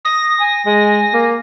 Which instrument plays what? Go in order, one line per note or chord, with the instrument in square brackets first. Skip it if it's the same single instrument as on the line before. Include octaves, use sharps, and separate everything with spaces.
[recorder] D#6 [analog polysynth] A#6
[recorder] G#5
[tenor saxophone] G#3 [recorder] G#5
[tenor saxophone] A#3